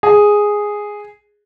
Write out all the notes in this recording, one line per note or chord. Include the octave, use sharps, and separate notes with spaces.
G#4